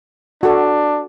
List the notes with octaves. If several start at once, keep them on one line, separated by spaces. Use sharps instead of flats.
D4 F#4 A4